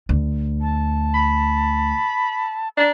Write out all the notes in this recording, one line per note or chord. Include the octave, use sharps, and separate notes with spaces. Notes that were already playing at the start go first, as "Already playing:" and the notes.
D2
A5
B5
D4 A#5